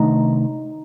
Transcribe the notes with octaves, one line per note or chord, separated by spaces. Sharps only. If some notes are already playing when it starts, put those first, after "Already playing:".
Already playing: C3 D#3 A3 D4 D#4